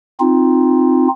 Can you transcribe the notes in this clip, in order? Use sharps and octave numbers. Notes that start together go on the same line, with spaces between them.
C4 D#4 F4